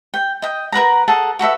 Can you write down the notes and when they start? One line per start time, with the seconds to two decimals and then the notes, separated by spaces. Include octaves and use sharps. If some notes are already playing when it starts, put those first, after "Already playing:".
0.14 G5
0.42 D#5 G5
0.72 A#4 B4 F#5 A#5
1.08 G#4 A4 F#5 A5
1.39 F#4 A4 B4 E5